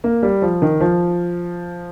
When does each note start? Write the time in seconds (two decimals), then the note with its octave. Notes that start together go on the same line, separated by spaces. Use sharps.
0.04 A#3
0.23 G3
0.42 F3
0.62 D#3
0.80 F3